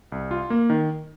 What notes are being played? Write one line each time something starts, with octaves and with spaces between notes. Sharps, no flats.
C2
F4
A#3
D#3